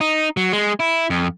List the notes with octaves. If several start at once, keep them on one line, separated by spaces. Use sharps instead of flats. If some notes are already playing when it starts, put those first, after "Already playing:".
D#4
F#3
G#3
E4
F2